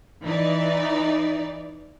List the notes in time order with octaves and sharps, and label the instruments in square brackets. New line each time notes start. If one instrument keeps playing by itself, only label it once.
[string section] E3 D#4 D5